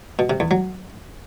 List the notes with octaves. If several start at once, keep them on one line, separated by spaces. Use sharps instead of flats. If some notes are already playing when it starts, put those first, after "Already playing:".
B2
C3
E2
F#3